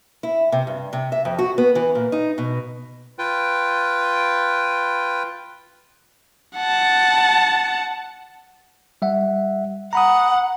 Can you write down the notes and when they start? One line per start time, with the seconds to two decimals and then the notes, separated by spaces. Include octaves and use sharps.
0.23 E4
0.52 C3
0.67 G2
0.93 C3
1.12 E5
1.25 F2
1.39 F#4
1.58 B3
1.75 E3
1.95 A#2
2.12 D#4
2.38 B2
3.19 F4 B4 G5
6.57 F#5 A5
9.02 G3 E5 F#5
9.93 F#5 A#5 B5 D#6